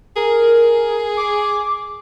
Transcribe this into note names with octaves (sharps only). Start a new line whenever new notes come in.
G#4 A#4
D6